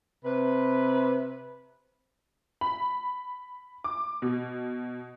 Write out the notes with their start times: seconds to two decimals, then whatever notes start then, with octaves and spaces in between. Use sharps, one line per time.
0.24 C3 B4
2.61 B5
3.84 D6
4.22 B2